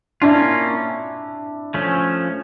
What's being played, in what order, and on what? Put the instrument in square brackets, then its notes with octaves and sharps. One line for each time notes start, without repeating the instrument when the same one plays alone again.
[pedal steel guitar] A#3 C#4 F4 [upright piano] D4 E4
[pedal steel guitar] F3 A3 C#4